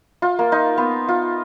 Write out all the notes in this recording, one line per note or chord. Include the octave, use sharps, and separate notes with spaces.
F4
A#3
D#4
B3
F4